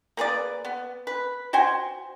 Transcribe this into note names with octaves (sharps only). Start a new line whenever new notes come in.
A#3 G#4 B4 D5
B3
B4
F#4 C5 G5 G#5